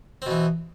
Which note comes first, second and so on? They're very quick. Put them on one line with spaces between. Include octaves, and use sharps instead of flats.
C4 B2 E3